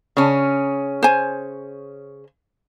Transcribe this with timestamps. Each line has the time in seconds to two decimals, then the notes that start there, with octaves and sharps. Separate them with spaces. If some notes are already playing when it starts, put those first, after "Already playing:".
0.17 C#3 C#4
1.03 C5 G#5